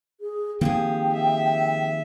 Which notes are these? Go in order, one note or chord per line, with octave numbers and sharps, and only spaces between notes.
G#4
D#3 F3 A#3 C4 G4 G#4 G5
E5